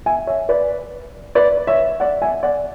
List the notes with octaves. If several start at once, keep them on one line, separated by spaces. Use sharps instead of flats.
E5 G#5
C#5 E5
B4 D5
B4 D5
C#5 E5
D5 F#5
E5 G#5
D5 F#5